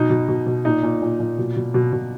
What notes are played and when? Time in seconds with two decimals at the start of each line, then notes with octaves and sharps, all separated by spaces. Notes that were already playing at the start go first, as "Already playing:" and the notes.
Already playing: B2 D#4
0.10 B2
0.28 B2
0.46 B2
0.65 A#2 D#4
0.83 A#2
1.02 A#2
1.19 A#2
1.38 B2
1.56 B2
1.74 B2
1.93 B2